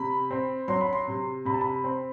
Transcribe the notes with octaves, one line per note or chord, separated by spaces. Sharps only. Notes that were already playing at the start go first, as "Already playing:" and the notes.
Already playing: C3 B5
C4
F#3 C6
B5
C6
C3
C3 B5
A5
B5
C4